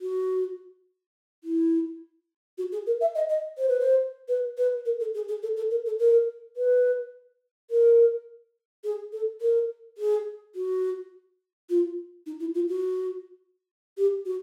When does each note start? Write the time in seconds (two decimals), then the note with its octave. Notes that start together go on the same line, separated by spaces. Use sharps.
0.01 F#4
1.44 E4
2.58 F#4
2.72 G#4
2.86 A#4
3.00 E5
3.15 D#5
3.29 D#5
3.58 C5
3.69 B4
3.79 C5
4.28 B4
4.57 B4
4.85 A#4
4.99 A4
5.14 G#4
5.28 G#4
5.42 A4
5.56 A4
5.70 A#4
5.85 A4
5.99 A#4
6.56 B4
7.70 A#4
8.84 G#4
9.12 A4
9.41 A#4
9.97 G#4
10.55 F#4
11.69 F4
12.26 D#4
12.39 E4
12.54 F4
12.68 F#4
13.97 G4
14.25 F#4